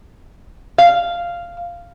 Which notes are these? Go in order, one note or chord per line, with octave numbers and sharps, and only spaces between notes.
F5